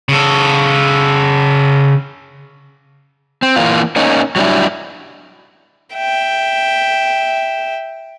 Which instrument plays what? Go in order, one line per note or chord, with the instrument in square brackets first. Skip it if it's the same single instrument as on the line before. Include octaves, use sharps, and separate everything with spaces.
[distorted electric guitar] C#3 A4
[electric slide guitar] C4
E3 A#3 F4
A#3 C#4 D#4
F#3 G3 D4 E4
[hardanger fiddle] E5 G5